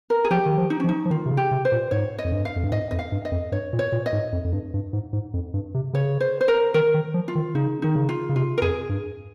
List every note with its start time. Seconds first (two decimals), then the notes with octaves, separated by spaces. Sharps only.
0.10 A#4
0.24 G#4
0.31 F3 G4
0.46 D#3
0.58 F3
0.70 D#4
0.80 C#4
0.84 F3
0.89 D#4
1.05 F3
1.10 D#3 F4
1.26 C3
1.31 C#3
1.37 G4
1.51 C3
1.65 C5
1.72 A#2
1.91 G#2 C#5
2.18 D#5
2.25 F2
2.32 G2
2.45 F5
2.56 F2
2.63 G2
2.72 G#2 D#5
2.91 F2 D#5
2.99 F5
3.12 G2
3.25 D#5
3.32 F2
3.52 G2 C#5
3.73 A#2
3.79 C#5
3.92 A#2
4.06 D#5
4.13 G#2
4.32 F2
4.45 F2
4.53 G2
4.74 G2
4.93 G#2
5.13 G#2
5.34 F2
5.54 G2
5.74 C3
5.93 C#3 C#5
6.20 C5
6.41 C5
6.48 A#4
6.74 D#3 A#4
6.94 D#3
7.14 F3
7.28 F4
7.35 D#3
7.55 C#3 D#4
7.82 D#3 D#4
7.95 C#3
8.09 F4
8.29 C#3
8.35 C3 F4
8.58 A#4
8.62 F2 G#4
8.89 G2